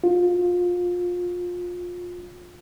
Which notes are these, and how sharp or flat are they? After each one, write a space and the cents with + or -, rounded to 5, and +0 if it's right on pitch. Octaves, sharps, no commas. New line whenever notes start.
F4 +25